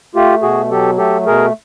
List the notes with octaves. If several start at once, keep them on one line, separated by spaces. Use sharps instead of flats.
A3 F4 G4
B2 F#4 G#4
F#3 G4 A4
A3 G4 A4
B2 G#4 A#4